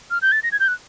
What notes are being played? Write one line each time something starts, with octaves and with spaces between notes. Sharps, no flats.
F6
G6
A6
A#6
G#6
G6
F#6